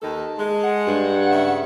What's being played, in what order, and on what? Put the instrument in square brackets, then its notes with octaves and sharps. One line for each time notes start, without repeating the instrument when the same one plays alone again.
[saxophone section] D#2 D#3 A4 [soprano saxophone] A5
[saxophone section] G#3
[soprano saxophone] F#5
[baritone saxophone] G2
[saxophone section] C#3 E5